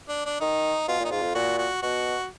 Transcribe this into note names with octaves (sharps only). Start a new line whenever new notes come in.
D4
D4
D#3 D#4
B2 F4
A#2
D#4
G#2 F4
F2
A#2 F#4
F#4
B2 F#4